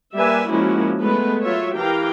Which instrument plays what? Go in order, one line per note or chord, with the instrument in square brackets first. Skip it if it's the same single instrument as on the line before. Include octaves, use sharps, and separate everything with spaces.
[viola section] G3 A#3 B4 E5 G#5
F3 G#3 A#3 C#4 E4 F#4
G#3 A3 B3 B4
F#3 F4 C#5 E5
E3 G4 A#4 F5 G5 A#5